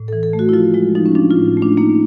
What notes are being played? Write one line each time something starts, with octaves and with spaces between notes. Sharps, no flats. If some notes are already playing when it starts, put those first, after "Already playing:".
Already playing: A2
E3 A4
A4
A3
F#4
E4
F3 F4
G#3 E4
F3 D#4
C#4
F3 D4
F4
A2
A3
D4
A#3 D#4